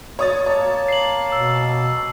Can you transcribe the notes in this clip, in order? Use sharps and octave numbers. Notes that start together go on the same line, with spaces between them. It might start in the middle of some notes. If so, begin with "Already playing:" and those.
C#5 D#6 A6
A#3 C#5 A5
C7 F#7
B2 E6